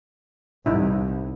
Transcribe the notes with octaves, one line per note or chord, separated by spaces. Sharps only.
C2 D#4 E4